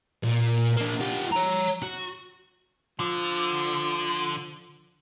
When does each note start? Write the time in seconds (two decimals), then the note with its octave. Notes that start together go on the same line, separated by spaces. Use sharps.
0.23 A#2
0.77 A#3 D4
1.01 F4 G4
1.32 C#5 A#5
1.82 F#4
3.00 D3 F3